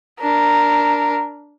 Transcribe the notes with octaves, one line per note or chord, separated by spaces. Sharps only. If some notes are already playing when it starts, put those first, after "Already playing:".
D4 A#4